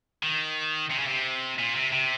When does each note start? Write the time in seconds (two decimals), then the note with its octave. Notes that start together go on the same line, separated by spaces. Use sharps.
0.23 D#3
0.90 C3
0.98 C#3
1.07 C3
1.59 A#2
1.75 C3
1.92 C3